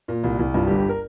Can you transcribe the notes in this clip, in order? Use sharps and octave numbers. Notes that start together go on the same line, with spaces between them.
A#2
C2
C2
G2 F4
G4
G1
G4
A#4